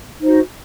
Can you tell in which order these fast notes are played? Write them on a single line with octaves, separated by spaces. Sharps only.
D#4 C5 F#4